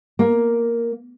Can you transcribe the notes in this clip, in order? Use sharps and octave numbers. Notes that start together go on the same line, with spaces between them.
A#3